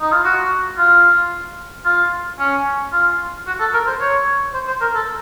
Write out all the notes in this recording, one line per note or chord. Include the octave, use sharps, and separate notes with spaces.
D#4
F4
F#4
F4
F4
C#4
F4
F#4
A4
A#4
C5
C#5
C5
C5
A#4
A4